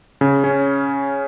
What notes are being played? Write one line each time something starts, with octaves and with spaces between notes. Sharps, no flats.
C#3
C#4